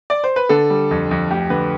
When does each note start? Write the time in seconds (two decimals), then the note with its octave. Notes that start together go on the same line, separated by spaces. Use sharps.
0.10 D5
0.24 C5
0.36 B4
0.49 D3 A4
0.70 G3
0.91 F2
1.11 F2
1.31 D2 G4
1.50 D3 B4